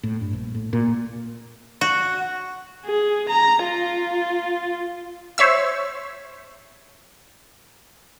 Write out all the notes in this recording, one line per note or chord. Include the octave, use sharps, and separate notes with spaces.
A2
G2
A#1
A2
A#2
F#4
G#4
A#5
F4
C5 C#5 E5 E6